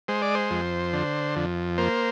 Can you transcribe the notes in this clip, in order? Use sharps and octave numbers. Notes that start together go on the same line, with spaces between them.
G#3 C5
D5
C5
F2
D3
F2
A#3 C5